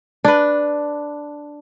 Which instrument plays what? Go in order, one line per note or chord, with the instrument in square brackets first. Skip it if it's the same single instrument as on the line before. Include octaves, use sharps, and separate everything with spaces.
[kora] D4 B4